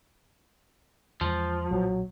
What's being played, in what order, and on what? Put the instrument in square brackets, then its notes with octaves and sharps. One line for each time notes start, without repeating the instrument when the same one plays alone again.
[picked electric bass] E2 E3 G#3 [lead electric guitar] F3
[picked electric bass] B1 A#2 [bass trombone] F#3